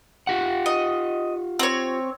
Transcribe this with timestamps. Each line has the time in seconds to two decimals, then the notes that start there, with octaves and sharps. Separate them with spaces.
0.27 F4 G4 F#5
0.66 D#5
1.59 C4 C#5